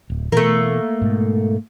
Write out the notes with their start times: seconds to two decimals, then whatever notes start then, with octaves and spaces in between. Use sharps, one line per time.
0.10 D1
0.32 B2 E3 A3 A#3
1.02 G#2 B2